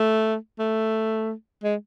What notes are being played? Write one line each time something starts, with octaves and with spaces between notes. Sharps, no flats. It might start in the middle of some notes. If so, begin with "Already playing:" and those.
Already playing: A3
A3
G#3